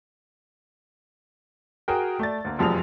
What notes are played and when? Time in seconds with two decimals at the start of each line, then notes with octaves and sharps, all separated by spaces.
1.88 F#4 G#4 A#4 G5
2.19 A3 D5 A6
2.45 D2 A#3
2.59 F1 F#2 F3 G3 G#4 F7